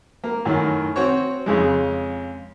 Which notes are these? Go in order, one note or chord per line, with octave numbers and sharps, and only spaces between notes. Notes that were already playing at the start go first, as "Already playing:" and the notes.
A#3
F#2 A2 D#3
C4 F#4 C#5
F2 C#3 G#3